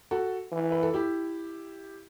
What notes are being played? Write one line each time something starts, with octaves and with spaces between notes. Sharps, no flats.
F#4 A4
E3
B4
A4
E4 G4